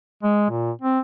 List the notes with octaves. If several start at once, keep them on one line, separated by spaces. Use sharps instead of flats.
G#3
A#2
C4